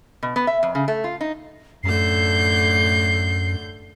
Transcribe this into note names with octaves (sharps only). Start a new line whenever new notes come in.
B2
B3
E5
F2
C#3
A3
F4
D#4
F#2 A2 D3 G6 C7